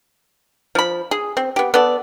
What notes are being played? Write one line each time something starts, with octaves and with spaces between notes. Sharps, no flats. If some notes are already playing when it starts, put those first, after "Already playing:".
F3 B5
G#4
C4
B3 G4
B3 A4 D5